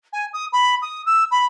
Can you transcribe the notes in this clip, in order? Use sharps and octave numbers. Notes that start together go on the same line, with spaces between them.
G#5
D#6
B5
D#6
E6
B5